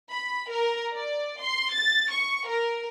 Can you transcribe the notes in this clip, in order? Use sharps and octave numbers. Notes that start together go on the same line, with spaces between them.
B5
A#4
D5
C6
A6
C#6
A#4